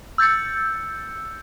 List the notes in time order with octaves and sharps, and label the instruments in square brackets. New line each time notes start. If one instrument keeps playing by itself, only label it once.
[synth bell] E6 G6 A6 C#7